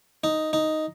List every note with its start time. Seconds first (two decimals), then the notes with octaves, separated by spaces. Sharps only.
0.24 D#4
0.53 D#4